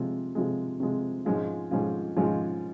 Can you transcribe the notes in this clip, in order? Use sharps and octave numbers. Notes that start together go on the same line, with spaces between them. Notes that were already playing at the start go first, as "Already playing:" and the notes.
Already playing: C3 F3 G#3
C3 F3 G#3
C3 F3 G#3
G#2 F3 G#3 C#4 F4
G#2 F3 G#3 C#4 F4
G#2 F3 G#3 C#4 F4